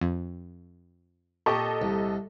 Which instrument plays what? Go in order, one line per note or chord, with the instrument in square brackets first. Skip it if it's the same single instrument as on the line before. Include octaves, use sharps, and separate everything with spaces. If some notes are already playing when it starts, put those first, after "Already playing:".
[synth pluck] F2
[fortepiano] A#2 G4 C#6 [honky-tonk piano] A4 D#5
[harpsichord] C2